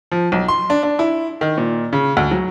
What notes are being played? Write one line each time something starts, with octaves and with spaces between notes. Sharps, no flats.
F3
B1
C6
D4
D4
E4
D#3
A#2
C#3
D2
F#3